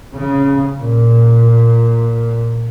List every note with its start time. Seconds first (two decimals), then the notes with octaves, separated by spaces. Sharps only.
0.14 C#3
0.79 A#2